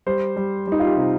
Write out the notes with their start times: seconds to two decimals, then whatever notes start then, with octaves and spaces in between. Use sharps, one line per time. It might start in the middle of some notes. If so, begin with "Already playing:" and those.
0.06 G3 C5
0.36 G3
0.67 G3 D#4
0.80 F4
0.86 G4
0.97 C3